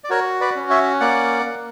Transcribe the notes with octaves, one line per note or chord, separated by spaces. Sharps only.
D5
F#4 A#4 C#5
B4 D5
C#4
C#5 E5
A#3 D5 F#5
A#3